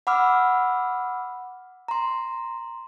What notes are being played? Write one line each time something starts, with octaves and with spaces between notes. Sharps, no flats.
F#5 B5 D6 E6 F6
A#5 C6